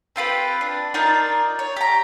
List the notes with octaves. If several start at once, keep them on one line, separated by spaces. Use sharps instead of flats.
C4 F4 G4 B4
D4
D#4 F4 A#4 D5
C#5
G4 A#5